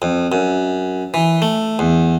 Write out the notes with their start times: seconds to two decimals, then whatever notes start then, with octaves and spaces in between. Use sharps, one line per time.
0.02 F2
0.32 F#2
1.14 E3
1.42 A3
1.79 E2